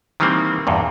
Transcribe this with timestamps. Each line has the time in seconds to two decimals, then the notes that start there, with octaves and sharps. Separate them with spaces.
0.20 D#3 E3 G3 A#3 C4
0.67 E2 G2 A#2